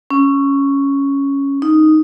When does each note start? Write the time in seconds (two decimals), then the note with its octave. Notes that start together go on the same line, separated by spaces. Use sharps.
0.11 C#4
1.62 D#4